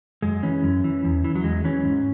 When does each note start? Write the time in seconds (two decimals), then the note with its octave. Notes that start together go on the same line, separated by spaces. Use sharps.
0.22 F#2 G#3
0.43 E3 C#4
0.64 F#2
0.84 E3
1.04 E2
1.24 E3
1.35 F#3
1.44 E2 G#3
1.64 E3 C#4
1.84 G#2